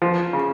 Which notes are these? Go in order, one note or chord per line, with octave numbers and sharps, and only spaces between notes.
F3
C#3